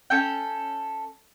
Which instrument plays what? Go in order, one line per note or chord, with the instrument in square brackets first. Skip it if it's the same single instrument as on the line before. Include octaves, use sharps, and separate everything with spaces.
[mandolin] C#4 A4 G5